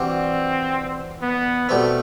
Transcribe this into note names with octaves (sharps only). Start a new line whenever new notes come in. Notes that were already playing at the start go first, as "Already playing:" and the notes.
Already playing: E3 G3 C4 D4 F#4
B3
B2 G3 A3 C4